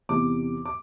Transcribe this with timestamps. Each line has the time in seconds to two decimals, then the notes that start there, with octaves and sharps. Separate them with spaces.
0.09 E2 C3 E3 D6
0.66 D6